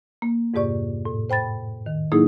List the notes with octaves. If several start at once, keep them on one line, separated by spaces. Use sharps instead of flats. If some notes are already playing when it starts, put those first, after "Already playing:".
A#3
F2 G#2 C3 G4 D5 C#6
A2
C5 G5 B5 A6
D#3
A2 F#3 A#3 D#4 E4 G#4